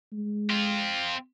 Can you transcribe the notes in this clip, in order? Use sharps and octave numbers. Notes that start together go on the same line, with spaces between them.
G#3
C4 F4